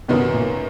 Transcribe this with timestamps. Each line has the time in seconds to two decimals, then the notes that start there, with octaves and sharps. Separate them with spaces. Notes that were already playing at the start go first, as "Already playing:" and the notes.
0.08 F#2 B2 D#3 G3 B3
0.33 A#2